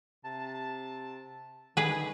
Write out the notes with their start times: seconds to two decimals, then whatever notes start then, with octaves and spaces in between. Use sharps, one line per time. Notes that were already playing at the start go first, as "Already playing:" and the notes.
0.25 C3 A5
1.77 D3 D#3 G#4 B4